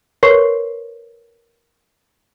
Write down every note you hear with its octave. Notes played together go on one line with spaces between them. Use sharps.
A#4 B4 C#5 C6 C#6 C7